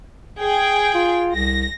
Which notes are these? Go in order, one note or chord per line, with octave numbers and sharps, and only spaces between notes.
G#4 G5
F4
C2 A#6